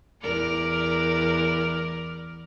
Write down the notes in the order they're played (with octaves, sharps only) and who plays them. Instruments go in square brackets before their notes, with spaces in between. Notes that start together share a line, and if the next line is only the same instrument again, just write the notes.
[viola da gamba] E2 A#4 D5